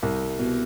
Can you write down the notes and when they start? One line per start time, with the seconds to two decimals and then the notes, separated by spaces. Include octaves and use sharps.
0.03 C2
0.39 B2